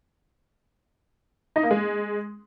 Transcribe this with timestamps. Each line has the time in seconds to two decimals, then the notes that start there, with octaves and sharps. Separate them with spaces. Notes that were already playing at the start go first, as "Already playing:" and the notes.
1.56 D#4
1.63 A#3
1.71 G#3